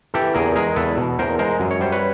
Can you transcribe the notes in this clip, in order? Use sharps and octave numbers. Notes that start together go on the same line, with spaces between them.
E3 G4 A4
E2 G#4 A#4
G#3 G#4 A#4
E2 A4 B4
B2
E2 A#4 C5
G#3 A#4 C5
F#2
C#5
G3 C5
B4 C#5